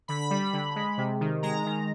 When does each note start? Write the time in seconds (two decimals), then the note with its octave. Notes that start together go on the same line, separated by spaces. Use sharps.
0.08 D3 B5
0.30 G3
0.53 D3
0.76 G#3
0.98 C3
1.20 D#3
1.43 G#3 A#5
1.66 D#3